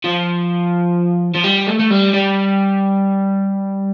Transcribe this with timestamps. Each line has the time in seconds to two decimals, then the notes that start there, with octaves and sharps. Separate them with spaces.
0.04 F3
1.34 F3
1.44 G3
1.67 A3
1.79 A3
1.91 G3
2.14 G3